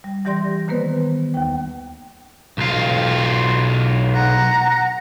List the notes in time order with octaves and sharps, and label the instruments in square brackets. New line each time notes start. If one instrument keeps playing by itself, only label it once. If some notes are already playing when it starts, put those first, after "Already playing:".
[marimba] G3
E3 G3 G4 D5 C6 A#6
D#3 A#3 B3 B4 C5
D#2 G5
[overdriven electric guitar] B1 F4
[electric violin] F#5 A#5